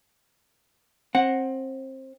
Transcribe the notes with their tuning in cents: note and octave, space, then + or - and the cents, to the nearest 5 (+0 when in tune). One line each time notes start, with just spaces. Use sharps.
C4 +25 F#5 +0